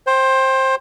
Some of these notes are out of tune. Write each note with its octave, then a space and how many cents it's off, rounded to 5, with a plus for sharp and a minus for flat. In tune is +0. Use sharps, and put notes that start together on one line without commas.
C5 +20 G5 +0